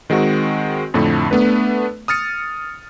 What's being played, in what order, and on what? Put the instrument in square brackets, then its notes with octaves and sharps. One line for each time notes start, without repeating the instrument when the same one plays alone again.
[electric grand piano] D#3 G#3 C4 F#4
F2 A2 D3 A3
A3 B3 D4 B4
D#6 F6 A6 C#7